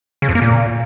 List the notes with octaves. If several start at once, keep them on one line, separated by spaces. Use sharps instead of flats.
C#3
F2
A#3
A#2